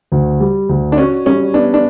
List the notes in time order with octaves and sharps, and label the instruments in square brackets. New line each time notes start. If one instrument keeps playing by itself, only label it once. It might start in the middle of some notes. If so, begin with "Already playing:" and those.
[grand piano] D2
G3
D2
[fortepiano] D4
[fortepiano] C#4 [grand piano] F#4
[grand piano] G3 [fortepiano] C#4
[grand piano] B3 [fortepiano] D4
[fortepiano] D4